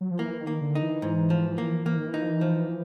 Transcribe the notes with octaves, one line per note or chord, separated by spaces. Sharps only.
F#3
F3
E3 A#3
D#3
A#3
D3
D#4
E3
G#2
F3
A#3
E3 A#3
D#3
E3
D#4
F3
E3
F3